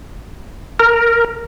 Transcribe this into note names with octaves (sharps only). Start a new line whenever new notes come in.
A#4